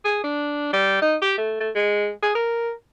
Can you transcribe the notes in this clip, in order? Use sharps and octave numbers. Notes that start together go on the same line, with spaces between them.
G#4
D4
G3
D#4
G4
A3
A3
G#3
G#4
A#4